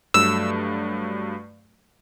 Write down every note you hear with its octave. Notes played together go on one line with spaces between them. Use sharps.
G2 F#3 A3 E6